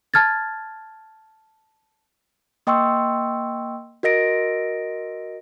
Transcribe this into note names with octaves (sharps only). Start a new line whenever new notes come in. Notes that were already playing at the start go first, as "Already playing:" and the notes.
A5 F6 G#6 A6
A#3 D#5 G5 C6 C#6 E6
F#4 A#4 D#5 A#6 D7